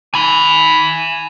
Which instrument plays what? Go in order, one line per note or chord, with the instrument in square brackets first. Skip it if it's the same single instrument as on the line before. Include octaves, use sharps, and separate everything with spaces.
[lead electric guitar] G#5 B5